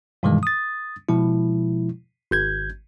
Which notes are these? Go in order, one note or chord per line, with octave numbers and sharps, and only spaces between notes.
G2 B2 D#3 E3 G3 G#3
D#6 A6
B2 F3 G#3 E4
G#1 G6 G#6